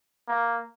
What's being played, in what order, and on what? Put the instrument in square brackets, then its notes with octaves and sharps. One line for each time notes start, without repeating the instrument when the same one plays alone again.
[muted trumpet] A#3